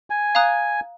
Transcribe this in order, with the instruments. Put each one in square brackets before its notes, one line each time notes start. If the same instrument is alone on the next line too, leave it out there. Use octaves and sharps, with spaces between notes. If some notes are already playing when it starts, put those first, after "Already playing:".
[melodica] G#5
[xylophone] F5 A#5 D#6 F#6